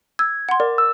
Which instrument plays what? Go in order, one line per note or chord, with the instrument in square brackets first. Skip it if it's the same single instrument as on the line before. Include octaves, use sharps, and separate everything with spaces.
[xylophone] E6 [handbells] G#6
[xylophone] F#5 C6
[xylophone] A#4 [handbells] D5
[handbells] E6